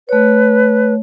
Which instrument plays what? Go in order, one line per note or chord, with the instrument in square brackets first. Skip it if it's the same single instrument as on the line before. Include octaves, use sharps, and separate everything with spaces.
[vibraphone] A3 C#5 [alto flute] B4